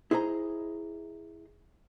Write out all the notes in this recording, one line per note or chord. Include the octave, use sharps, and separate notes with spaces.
E4 G#4 C5 D#5 A#5